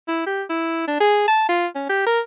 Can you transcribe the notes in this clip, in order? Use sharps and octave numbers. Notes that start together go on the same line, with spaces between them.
E4
G4
E4
D4
G#4
A5
F4
C#4
G4
A#4